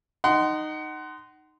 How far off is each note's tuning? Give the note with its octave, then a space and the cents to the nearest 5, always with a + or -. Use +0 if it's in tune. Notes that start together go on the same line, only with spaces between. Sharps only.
D#4 -10 F#5 +25 C6 -15